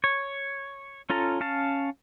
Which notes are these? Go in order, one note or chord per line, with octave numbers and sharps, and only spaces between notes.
C#5
C#4 F4 A4 A#5
C#4 F5 A5